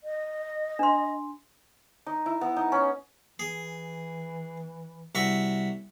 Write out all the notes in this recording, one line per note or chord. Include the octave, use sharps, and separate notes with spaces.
D#5
D4 C6
D#4
E4
B3
D#4
C#4
E3 G#4
C2 F#4 E5